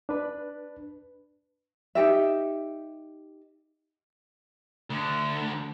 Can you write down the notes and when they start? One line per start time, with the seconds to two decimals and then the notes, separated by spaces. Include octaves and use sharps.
0.09 D4 B4
1.95 D#4 F4 G4 E5
4.90 D2 D3